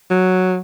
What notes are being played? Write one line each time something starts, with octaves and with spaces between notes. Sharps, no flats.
F#3